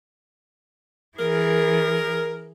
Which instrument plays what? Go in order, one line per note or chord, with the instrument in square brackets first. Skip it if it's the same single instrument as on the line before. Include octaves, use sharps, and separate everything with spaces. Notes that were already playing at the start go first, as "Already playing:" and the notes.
[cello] E3 G#4 [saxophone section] A#4